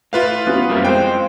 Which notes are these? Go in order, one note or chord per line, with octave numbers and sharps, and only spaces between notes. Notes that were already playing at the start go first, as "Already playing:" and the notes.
A2 E4 F4 B4 F5
B3 C#4 F#4
F#2 G3 A#3 E4
G#3 C4 F4 C5 G5